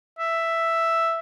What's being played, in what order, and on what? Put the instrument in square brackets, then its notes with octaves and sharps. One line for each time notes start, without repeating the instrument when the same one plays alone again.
[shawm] E5